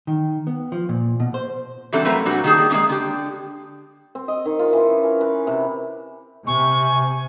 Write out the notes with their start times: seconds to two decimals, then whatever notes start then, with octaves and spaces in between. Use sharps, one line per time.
0.07 D#3
0.47 B3
0.72 F3
0.89 A#2
1.20 B2
1.34 C5
1.93 E3 F#3 G3 C4 D4 A4
2.04 F3 F#3 A3 C4 A#4 B4
2.26 A#2 G3 D4 F#4
2.44 D#3 G3 A#3 G4 G#4 A5
2.70 G#3 A#3 C4 G4 G#4
2.89 D3 G4
4.15 C4
4.28 D#5
4.46 D#3
4.59 F4
4.73 E3
4.88 C#4
5.03 A#4
5.21 B4
5.47 C3
6.47 C3 G#5 C#6